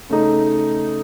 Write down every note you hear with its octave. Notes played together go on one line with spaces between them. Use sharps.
C#3 A3 D#4